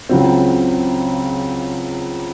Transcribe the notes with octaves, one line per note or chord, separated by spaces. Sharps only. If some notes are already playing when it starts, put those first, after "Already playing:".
C#2 C#3 F#3 C4